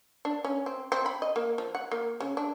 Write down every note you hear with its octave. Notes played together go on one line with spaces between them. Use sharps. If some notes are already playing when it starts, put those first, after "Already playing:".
D4
C#4
C4
C4
B5
D#5
A#3
F3
F#5
A#3
C#3
D4